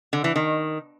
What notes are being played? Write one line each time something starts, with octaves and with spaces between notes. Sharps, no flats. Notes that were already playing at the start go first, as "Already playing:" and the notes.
D3
E3
D#3